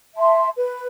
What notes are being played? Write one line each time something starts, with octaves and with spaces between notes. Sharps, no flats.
E5 A5 C6
B4